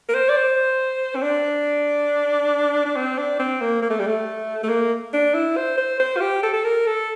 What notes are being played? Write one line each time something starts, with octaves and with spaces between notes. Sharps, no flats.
A#4
C5
D5
C5
C4
D4
D4
C4
D4
C4
A#3
A#3
A3
G3
A3
A3
A#3
D4
E4
C5
C5
C5
F4
G4
A4
A4
A#4
A4